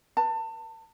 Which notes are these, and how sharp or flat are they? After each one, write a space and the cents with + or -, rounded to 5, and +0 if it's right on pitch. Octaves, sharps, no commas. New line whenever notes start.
B4 -30 A5 +30